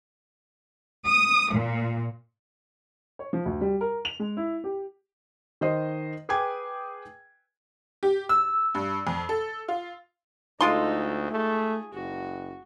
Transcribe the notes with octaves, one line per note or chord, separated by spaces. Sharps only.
D#6
A#2
C#5
F3
D2
G3
A#4
F7
G#3
E4
G4
D#3 C5 D#5
G#4 B4 G5 G#5 D6 G#6
G4
E6
G2
F2
A4
F4
D2 G#3 D#4 F4 A4 C6
A3 G#4
F#1 F#4